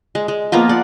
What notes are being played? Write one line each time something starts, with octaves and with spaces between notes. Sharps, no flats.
G#3
G#3
F3 A#3 B3 F4
D5 F#5